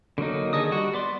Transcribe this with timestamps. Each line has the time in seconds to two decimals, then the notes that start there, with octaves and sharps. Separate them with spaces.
0.18 D3 F#3 A#3 D#4
0.53 D#3 G#4 A4 D#5 D#6
0.71 G3 F#4
0.94 B3 D5 C6